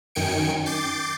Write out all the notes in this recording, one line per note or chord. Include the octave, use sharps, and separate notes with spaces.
F#2 D#3 G5 G#5 C#7 D7
D6 G6 A6 C7